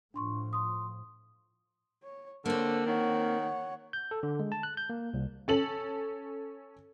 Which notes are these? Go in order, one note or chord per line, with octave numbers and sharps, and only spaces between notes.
A2 F3 D4 C6 C#6
C6 D#6
C#5
D3 A#3 C4 C5 C#5
D#3 C#5 F#5
G6
A4
D3
G#3
A5
F#6
G6
A#3
C2
C#4 A4 F#7